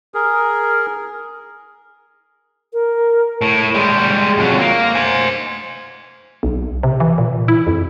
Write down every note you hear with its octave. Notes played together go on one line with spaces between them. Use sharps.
G#4 A#4
A#4
A2
G3 G#3
F2 F#3
A#3
C5 G#5
B1
C3
E3
A#2
E4
F2